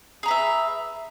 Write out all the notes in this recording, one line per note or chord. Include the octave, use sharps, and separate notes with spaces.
G#4 B4 E5 A#5